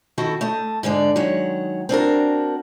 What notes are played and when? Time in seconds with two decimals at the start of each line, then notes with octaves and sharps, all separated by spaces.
0.18 D#3 C4 E4 F#4 A4
0.41 A3 D#5 A5
0.83 G#2 D3 G#3 D5
1.16 D#3 F#3 G#3 C#5 F#5
1.89 C4 D4 F#4 A#4